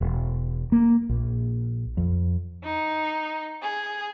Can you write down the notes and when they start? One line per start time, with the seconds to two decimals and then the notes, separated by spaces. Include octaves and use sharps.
0.01 E1
0.72 A#3
1.09 A#1
1.97 F2
2.64 D#4
3.63 G#4